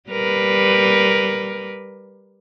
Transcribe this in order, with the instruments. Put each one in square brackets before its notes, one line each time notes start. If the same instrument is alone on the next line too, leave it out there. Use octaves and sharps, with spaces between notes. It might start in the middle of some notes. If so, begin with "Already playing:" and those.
[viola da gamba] G3 A#4 B4